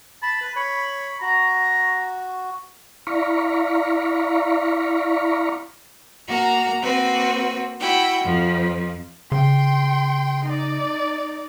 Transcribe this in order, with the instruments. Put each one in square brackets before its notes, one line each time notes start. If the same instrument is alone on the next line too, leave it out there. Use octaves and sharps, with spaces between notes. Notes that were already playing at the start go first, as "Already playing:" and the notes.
[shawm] A5 [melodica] B5
[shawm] B4
[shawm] C#5 [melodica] B5
[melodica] F#4 [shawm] A#5
[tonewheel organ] E4 D5 F5 A#5 B5 C#6
[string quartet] A#3 F#4 A#5
A#3 C4 F#4 B4
E4 F#4 G5
F2 F3
[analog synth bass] C#3 [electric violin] G5 C6
[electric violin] D#4 D5